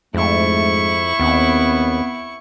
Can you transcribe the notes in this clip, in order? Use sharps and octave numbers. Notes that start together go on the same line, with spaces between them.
F2 G#2 A3 E4 C#6
D#2 B3 C4